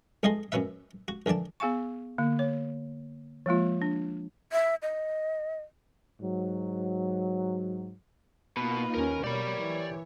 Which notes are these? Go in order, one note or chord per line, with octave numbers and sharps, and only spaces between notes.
B1 A3 G#4 D#5 G#5 C6
F#2 B2 C#4 B4 E5
F#4
A#1 D3 E3 D5 A5
B3 G#4 F5 G#5 C#6
D3 A#3
C#5
F3 G#3 A#3 F4
D4
E5
D#5
G#2 F#3
B2 A#3 D#4 F4 B4
D#2 C#4 A#4
B2 A#3 G4 C#5 D5 B5
E3